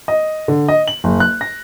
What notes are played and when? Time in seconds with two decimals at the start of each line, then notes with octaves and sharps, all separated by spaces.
0.08 D#5
0.48 D3
0.68 D#5
0.88 F#7
1.04 F#1
1.20 F#6
1.41 A#6